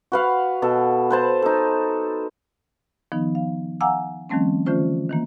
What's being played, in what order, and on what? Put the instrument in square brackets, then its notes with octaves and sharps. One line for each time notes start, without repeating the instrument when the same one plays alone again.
[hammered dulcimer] F#4 B4 F5
B2 A4
B4 C5 A5
D#4 A4
[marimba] D#3 F3 B3 D#4
F5
F5 F#5 G#5 A#5 D6 E6
D#3 F3 G3 A3 C4 C#4
D3 E3 A3 C#4 F4 C5
D#3 E3 A#3